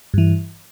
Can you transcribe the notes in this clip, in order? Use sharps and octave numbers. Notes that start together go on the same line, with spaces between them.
G2 E3